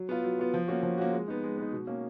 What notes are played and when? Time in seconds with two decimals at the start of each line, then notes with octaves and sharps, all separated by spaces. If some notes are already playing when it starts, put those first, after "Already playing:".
Already playing: F#3
0.09 B3 F4
0.24 F#3
0.39 B3 F4
0.54 F3
0.68 A#3 C#4 F#4
0.83 F3
0.98 A#3 C#4 F#4
1.12 G#3
1.28 B3 D#4
1.43 G#3
1.58 B3 D#4
1.72 B2
1.87 A#3 C#4